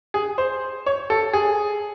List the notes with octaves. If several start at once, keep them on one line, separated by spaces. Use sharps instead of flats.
G#4
C5
C#5
A4
G#4